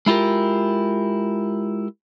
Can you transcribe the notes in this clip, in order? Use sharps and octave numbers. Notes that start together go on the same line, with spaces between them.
G#3 E4 F4 G4 A#4